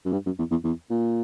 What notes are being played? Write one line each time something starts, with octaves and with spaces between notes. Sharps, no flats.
F#2
G2
F#2
E2
E2
E2
A#2